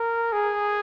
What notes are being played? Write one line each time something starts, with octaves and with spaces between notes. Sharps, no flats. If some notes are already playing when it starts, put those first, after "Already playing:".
Already playing: A#4
G#4